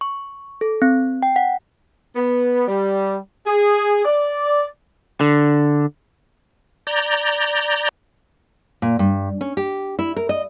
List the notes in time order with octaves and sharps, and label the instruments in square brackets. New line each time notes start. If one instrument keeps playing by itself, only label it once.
[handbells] C#6
A4
C4
G5
F#5
[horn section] B3
G3
G#4
D5
[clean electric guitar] D3
[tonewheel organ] D5 A#5 G6
[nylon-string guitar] A#2
G2
C#4
G4
E4
A#4
D#5